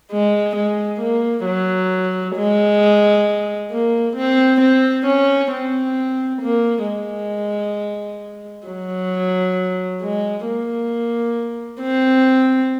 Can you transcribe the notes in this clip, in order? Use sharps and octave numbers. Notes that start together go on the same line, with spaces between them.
G#3
G#3
A#3
F#3
G#3
A#3
C4
C4
C#4
C4
A#3
G#3
F#3
G#3
A#3
C4